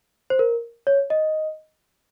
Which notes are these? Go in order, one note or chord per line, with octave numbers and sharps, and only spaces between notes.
C5
A#4
C#5
D#5